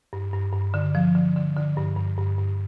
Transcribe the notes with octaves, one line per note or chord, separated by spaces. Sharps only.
G2
G2
G2
D3
F3
D3
D3
D3
G2
G2
G2
G2